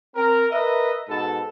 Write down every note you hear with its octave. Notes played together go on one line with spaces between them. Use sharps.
C4 A#4
A#4 B4 D#5 E5
G#2 B2 A4 A5 B5